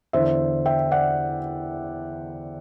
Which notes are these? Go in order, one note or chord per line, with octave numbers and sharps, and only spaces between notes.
E2 D3 C5 E5
E5 G5
D5 F#5